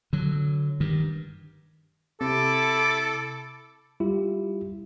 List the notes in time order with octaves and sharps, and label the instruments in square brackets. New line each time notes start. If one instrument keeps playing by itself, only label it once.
[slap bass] D3 F#3
G2 D#3
[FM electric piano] C3 [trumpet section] E4 D6 [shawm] A4
[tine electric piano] G3 E4 F4 G4